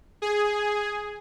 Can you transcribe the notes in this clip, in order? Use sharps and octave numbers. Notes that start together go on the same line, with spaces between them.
G#4